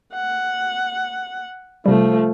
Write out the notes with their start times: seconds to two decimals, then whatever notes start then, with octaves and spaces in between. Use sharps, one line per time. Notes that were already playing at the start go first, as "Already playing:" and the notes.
0.14 F#5
1.86 C3 F3 G3 A3